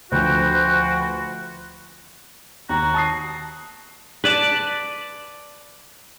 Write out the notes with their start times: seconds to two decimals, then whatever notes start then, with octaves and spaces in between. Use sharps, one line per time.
0.12 D2 F3 F#4 B4 C5 G5
2.69 D#2 F#4 A#5
2.94 A5 D#6 C7
4.24 B4 D5 A5